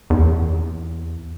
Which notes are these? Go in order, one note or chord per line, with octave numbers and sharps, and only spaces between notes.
E2